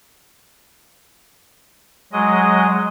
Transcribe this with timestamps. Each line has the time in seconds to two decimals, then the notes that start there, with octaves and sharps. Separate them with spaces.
2.13 F#3 G#3 D#5